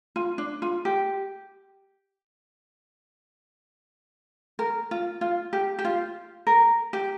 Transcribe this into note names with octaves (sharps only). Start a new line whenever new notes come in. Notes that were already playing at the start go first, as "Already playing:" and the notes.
F4
D4
F4
G4
A#4
F4
F4
G4
G4
F4
A#4
G4